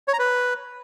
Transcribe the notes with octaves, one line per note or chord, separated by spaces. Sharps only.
C#5
A#5
B4